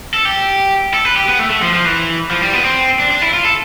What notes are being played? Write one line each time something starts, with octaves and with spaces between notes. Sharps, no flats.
A4
G4
A4
B4
G4
B3
A3
A3
F3
F3
E3
F3
G3
B3
C4
D4
D4
E4
F4
A4